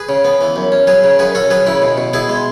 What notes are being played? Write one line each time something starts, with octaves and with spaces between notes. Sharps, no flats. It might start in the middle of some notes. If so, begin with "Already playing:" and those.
Already playing: G#4 B4
C#3
B3
E3
F#2
C#4
F#3 G#4 B4
C#3
F#2 G#4 B4
C#4 F#4 A4
F#3 G#4 B4
C#3 E4
B2
B2
B3 E4 G#4
G#3